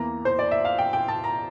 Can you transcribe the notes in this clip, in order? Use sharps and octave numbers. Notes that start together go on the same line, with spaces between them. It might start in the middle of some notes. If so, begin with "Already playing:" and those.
Already playing: E2 E3 A#3 A#5
C5
D5
E5
F5
G5
G5
A5
A#5